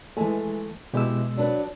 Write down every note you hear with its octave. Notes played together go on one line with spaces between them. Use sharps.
E3 G#3 A3 G#5
B2 G#3 E4 G4 E6
F#3 D4 B4